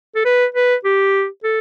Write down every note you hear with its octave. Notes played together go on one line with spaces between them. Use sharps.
A4
B4
B4
G4
A4